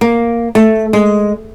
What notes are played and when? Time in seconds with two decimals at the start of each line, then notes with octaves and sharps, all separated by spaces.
0.01 A#3
0.55 A3
0.93 G#3